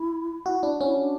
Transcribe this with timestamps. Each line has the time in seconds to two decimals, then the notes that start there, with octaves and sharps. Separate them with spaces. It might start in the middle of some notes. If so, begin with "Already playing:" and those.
Already playing: E4
0.46 E4 F#4
0.59 D4 E4
0.81 C#4 E4
0.98 D4